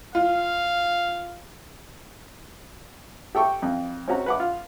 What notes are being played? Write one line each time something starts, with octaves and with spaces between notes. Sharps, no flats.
F4 F5
G4 A4 G5 C#6
F2
C4 C#4 F#4 A#5
B4 F#5 D6
F4